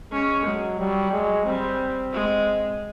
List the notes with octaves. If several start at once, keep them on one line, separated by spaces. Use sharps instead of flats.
G#3 C#4
F#3 G#3
F#3 G3
F#3 G#3
G3 C4
G#3